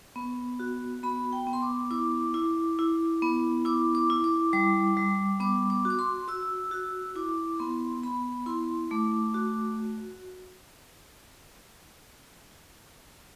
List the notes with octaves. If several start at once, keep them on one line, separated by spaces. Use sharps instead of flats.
B3
F#4
B3 B5
G5
B3
C6
D6
E4 D6
E4
E4
B3
E4 D6
D6
E4
D6
G3 D6
G3
B3 D6
D6
F#4
D6
C6
F#4 E6
F#4
E4 D6
B3 C6
B3 B5
E4 C6
A3 D6
F#4